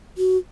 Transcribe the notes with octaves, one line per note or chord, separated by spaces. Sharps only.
F#4